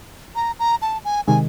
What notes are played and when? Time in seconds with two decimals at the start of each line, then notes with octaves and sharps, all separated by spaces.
0.35 A#5
0.59 A#5
0.82 A5
1.05 G#5
1.27 C3 D#3 G#3 G#5